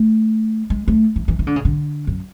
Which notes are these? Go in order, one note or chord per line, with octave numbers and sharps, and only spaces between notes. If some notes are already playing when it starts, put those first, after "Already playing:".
Already playing: A3
G#3
A3
E3
E3
E3
D3
C#3
D3
F#2